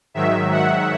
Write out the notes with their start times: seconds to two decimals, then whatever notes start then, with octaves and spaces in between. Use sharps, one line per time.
0.14 G#2 D#3 F#3 E5
0.52 F#5